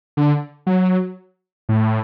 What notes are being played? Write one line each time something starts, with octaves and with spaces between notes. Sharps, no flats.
D3
F#3
A2